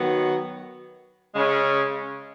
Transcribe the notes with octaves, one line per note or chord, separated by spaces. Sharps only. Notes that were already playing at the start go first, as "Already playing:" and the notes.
Already playing: D#3 F#3 B3
C#3 G#3 C#4